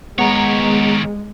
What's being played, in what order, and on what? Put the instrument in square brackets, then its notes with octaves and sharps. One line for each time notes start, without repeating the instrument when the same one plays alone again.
[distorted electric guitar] D#3 C#5 [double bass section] G#3 [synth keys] B3 A#5